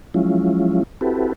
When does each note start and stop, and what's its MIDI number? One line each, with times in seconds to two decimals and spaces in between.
0.14 0.83 53
0.14 0.83 54
0.14 0.83 56
0.14 0.83 61
0.14 0.83 64
0.14 0.83 65
1.01 1.33 60
1.01 1.33 64
1.01 1.33 66
1.01 1.33 67
1.01 1.33 69
1.01 1.33 71